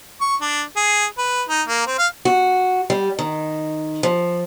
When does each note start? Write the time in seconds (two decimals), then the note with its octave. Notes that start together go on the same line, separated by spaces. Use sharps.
0.21 C#6
0.41 D4
0.76 G#4
1.18 B4
1.49 D#4
1.68 A#3
1.87 C4
1.99 F5
2.25 F#4
2.90 G3
3.19 D#3
4.03 F3